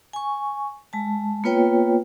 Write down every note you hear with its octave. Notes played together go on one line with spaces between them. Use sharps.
G#5 C#6
G#3 A5
A#3 B3 F4 B4 C#5 G5